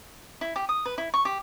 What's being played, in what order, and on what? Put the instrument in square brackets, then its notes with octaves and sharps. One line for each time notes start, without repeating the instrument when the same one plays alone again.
[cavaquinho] E4
G4
D#6
B4
E4
C#6
G4